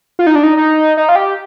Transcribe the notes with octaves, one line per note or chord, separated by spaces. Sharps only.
F4
D#4
D4
D#4
D#4
D#4
F4
G4